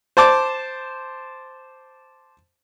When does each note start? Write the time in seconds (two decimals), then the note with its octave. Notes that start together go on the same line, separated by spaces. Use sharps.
0.17 C5 A5 D6